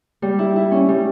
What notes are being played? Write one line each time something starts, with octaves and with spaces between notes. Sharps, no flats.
G3
E4
E4
C#4
G3